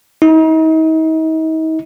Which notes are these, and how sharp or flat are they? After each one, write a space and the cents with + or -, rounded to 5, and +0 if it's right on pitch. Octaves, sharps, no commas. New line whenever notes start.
D#4 +40